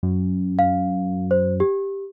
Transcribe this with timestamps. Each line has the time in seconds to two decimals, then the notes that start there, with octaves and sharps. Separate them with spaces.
0.03 F#2
0.59 F5
1.31 C5
1.60 G4